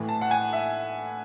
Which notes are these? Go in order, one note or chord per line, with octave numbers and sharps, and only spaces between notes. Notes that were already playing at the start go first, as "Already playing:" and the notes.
Already playing: A2 E3
A5
F#5
G#5
E5